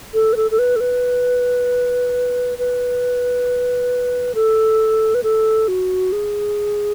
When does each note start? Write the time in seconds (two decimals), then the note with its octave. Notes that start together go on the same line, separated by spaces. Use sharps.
0.14 A4
0.33 B4
0.36 A4
0.51 A4
0.59 B4
0.76 A4
0.80 B4
2.58 B4
4.35 A4
5.15 B4
5.23 A4
5.68 F#4
6.12 G#4